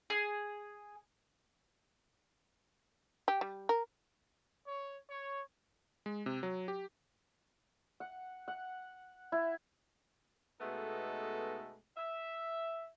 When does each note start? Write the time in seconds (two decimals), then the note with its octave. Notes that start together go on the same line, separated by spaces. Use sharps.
0.10 G#4
3.28 G4
3.41 G3
3.69 A#4
4.66 C#5
5.10 C#5
6.06 G#3
6.26 C3
6.43 F#3
6.68 G4
8.00 F#5
8.48 F#5
9.32 E4
10.61 B2 G#3 A3 B3 D#4 A4
11.97 E5